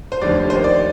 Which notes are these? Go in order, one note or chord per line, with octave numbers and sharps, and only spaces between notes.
C5
F1 D#2 D3 F3 D5
D#2 D#3 C5
D5